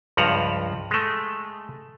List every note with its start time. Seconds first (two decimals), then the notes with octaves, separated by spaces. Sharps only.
0.17 C#2 G2 F3 F#5 A#5
0.91 G#3 A3